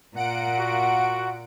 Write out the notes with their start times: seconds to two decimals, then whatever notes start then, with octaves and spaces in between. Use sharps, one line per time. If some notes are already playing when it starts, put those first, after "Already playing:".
0.16 A#2 A#3 F#5 D7
0.59 F#4